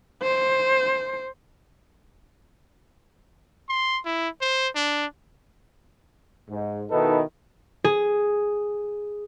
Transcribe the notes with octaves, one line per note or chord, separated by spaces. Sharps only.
C5
C6
E4
C5
D4
G#2
B2 D#3 D#4 E4 A4 B4
G#4